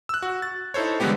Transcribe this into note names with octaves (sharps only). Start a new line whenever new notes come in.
E6 F#6
F#4
A6
D#4 E4 A4 C5 C#5
D3 E3 G3 G#3 B3 G4